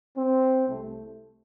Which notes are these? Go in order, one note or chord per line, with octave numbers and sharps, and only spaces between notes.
C4
C2 C3 A3